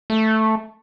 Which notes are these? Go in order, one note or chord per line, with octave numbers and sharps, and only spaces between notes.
A3